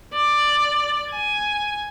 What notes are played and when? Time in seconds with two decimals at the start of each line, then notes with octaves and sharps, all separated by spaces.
0.14 D5
1.11 G#5